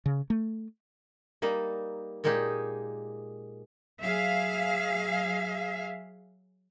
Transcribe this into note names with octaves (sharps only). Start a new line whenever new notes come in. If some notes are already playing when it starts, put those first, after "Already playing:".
C#3
A3
G3 A#3 D#4
A#2 G#3 A#3 D#4 G4 G#4
F#3 G#4 E5 F5